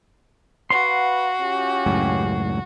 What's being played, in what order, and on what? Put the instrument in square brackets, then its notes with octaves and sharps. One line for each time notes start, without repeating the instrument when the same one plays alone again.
[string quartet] F#4 [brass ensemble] B4 F5 F#5 [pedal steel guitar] C6
[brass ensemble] C#4 F4 G4
[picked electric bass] C#2 F#2 A2